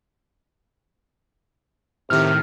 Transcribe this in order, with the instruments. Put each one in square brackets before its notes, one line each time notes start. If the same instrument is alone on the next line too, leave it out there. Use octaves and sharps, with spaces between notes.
[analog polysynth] A2 D#3 [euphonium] C3 [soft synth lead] F6